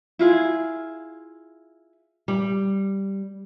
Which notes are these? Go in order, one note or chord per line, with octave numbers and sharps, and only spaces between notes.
E4 F4 G#4
G3